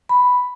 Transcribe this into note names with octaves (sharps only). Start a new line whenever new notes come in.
B5